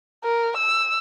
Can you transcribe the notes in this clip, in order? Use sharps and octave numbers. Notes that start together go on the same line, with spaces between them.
A#4
E6